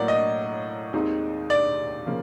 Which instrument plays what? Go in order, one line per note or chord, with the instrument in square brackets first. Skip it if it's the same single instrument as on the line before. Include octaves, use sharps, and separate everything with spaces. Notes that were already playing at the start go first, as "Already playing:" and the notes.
Already playing: [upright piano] A2 F#3 A#3 [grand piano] D5
[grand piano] D#5
[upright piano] D#2 D#3 G#3 C4 D#4
[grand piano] D5
[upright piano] C#3 F3 A#3